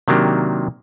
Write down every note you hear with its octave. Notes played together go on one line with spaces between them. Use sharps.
C3 D#3 F#3 A#3 D4 G4